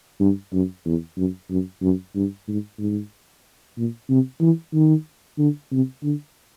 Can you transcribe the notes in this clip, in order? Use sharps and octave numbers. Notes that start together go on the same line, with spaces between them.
G2
F#2
E2
F#2
F#2
F#2
G2
G#2
G#2
A#2
C3
E3
D#3
D3
C3
D3